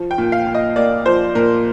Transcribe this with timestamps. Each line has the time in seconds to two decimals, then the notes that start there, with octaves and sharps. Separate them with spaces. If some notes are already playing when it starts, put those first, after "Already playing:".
Already playing: F3
0.11 G5
0.18 A#2
0.32 F5
0.47 A#2
0.55 D#5
0.76 A#3 D5
1.05 F3 C5
1.35 A#2 A#4